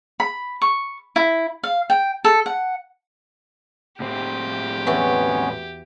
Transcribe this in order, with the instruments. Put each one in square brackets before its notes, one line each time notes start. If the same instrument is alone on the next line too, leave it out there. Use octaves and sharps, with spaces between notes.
[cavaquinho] B5
C#6
E4
F5
G5
A4
F#5
[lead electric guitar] A2 C4 [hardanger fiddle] G4
[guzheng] E2 E3 F#4 [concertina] B3 C#4 C#5